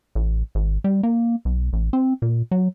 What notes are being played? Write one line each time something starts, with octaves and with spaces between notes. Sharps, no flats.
A1
G#1
G3
A#3
B1
A1
C4
A#2
F#3